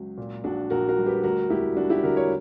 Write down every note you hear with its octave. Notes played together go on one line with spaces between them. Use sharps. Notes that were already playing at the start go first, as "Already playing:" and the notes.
Already playing: C#2 F#3
A#2
A#1 D4 F#4
A#1 F#4 A#4
F#4 A#4
G3
G4 B4
D2 F#4 A#4
E1 E4 G4
G3 D4 F#4
E4 G4
D3 F#4 A#4
A#4 C#5